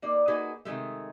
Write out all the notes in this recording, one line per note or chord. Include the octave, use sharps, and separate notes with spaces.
A#3 D#4 D5
A#3 D#4 F#4 G#4 B4
C3 D#3 F#3 G#3 A3